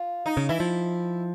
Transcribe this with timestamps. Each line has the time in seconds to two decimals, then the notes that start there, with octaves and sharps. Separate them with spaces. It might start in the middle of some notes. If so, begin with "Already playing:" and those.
Already playing: F4
0.26 D#4
0.37 C#3
0.49 E3 E4
0.60 F3